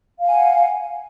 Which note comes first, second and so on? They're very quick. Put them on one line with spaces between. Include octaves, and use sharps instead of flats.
F5 G#5 F#5